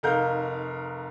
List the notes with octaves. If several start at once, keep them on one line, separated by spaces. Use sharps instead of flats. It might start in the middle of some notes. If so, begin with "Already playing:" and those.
F1 D#4 A#4 F5 F#5 G6